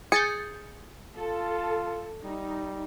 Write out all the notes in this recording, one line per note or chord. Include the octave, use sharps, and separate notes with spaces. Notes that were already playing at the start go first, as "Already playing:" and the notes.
G#4 G6 A6 C#7
F4 A4
G3 D#4